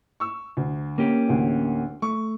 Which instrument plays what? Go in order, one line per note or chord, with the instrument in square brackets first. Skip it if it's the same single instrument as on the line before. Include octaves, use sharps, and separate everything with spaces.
[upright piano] C#6 E6
D2
[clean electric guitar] A#3 C#4 G4
[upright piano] A1 D2
[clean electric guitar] A3 [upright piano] C#6